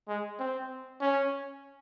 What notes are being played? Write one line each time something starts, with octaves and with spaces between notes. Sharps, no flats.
G#3
C4
C#4